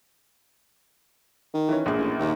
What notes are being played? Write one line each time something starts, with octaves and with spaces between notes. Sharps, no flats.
D#3
E3 C#4
A#1 A#2 G#4
A1
D#2